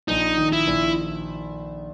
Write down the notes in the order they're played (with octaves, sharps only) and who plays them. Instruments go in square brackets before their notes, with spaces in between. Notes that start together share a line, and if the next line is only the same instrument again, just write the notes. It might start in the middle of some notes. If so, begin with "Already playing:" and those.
[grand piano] A#1 [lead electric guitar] D#4
[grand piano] D#3
[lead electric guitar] E4
[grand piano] A#1